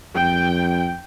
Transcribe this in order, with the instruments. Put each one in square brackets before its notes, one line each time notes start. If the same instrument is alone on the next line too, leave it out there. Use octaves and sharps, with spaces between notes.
[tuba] F2 [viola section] G5